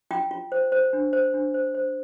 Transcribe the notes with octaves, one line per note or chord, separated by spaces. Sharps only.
F4 G5
F4
C5
C5
D4
C5
D4
C5
C5